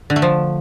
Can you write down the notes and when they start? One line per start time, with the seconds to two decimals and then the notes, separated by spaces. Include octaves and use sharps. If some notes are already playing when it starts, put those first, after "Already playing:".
0.10 D3
0.16 A3
0.22 F3